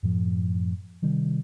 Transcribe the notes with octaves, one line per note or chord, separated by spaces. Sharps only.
F#2 A2 F3
C3 D#3 G3